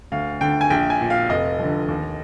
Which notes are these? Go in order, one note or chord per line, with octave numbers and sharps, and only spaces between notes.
D2 F5
D3 G5
G#5
A#1 G5
G#5
A#2
F5
F1 D#5
F2 D3
D#2